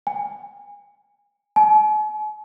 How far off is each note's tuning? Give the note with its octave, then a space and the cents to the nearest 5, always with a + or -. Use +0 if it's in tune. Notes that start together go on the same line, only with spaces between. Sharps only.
G#5 -30
G#5 +45